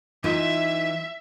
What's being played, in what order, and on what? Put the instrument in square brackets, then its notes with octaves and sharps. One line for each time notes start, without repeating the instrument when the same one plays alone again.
[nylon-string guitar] E3 D#4 F4 [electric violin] E5